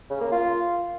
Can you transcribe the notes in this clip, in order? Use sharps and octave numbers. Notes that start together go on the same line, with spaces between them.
C#3
A#3
F4